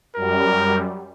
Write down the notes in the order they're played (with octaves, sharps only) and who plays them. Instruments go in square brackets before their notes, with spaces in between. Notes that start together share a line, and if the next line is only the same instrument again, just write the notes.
[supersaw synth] F#2 G3 [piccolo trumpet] A#4